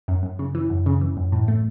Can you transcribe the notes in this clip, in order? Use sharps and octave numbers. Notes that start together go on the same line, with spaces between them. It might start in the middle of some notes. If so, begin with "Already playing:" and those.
F#2
F#2
C#3
E3
F#2
C#3
E3
F#2
A2
A3